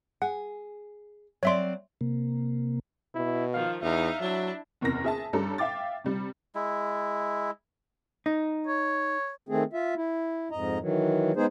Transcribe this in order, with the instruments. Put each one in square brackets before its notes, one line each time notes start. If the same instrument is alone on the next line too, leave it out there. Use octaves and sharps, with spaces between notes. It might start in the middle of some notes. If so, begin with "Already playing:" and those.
[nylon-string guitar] G#4 [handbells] F#5
[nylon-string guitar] F#3 C4 D5 [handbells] C#5 E5 C6
[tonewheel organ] C3 A#3
[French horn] B2 [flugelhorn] E4
[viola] D#3 F3 [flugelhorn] F5
[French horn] E2 [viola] D#4 F5 [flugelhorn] E5
[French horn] F#3 [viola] D4 E4
[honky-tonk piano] F#1 E2 C3 A#4 A#6
G#4 E5 A5
G2 G3 C#4 A4 A#5
E5 F5 G5 D6 A6
C3 G3
[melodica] G#3 E4
[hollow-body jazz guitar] D#4
[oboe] C#5
[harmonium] D#3 A3 C4 G#4
F4 E5
E4
F2 G#2 D#5 A#5
D#3 E3 F#3
G#3 B3 D#4 G#4 C5